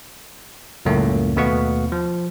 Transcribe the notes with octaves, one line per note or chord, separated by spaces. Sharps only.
C#2 F#2 A2 A3 A#3
D#2 B2 A3 B3 F5 C#6
F3